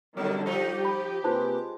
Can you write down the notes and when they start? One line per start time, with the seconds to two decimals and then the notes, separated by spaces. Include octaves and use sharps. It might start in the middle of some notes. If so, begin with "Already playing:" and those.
0.17 B2 D3 D#3 F#3 G3
0.46 F3 D#4 G4
0.85 B5
1.24 C3 G#3 A#3 F4 B4 C5 A5